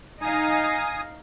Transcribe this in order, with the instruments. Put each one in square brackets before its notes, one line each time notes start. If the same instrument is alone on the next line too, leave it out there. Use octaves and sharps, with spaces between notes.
[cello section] D#4 F5 [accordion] G#5 D#6